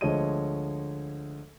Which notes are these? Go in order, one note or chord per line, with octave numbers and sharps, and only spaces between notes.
D2 F3 G#3 C#5 D#5 D#7